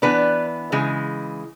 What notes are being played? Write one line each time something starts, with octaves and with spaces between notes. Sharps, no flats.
E3 B3 D4 B4
C#3 E3 G#3